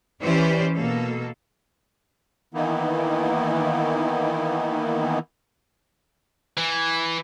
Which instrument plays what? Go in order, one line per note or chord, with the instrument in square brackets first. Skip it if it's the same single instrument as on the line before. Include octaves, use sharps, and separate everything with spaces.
[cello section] E3 C#4 G4 B4 C5 D5
B2 A#3 A4
[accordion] D#3 E3 A#3 B3 D#4 E4
[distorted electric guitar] E3